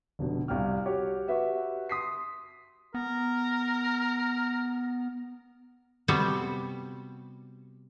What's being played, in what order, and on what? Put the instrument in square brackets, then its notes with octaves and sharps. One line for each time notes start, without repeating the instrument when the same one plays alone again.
[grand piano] F1 B2 D3
C2 F5 G5 F6
F#4 G4 C#5
F#4 G4 B4 E5 F#5
C6 D#6 B6 C7
[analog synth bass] B3 [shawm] A#4
[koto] C3 G3 B3 C4 F#4 A5